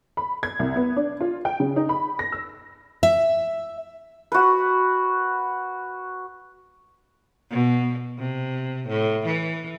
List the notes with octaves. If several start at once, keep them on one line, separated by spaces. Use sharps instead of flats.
B5
G#6
C2
B3
D4
F4
G5
C#3
D#4
B5
A#6
E6
E5
F#4 B4
B2
C3
A2
E3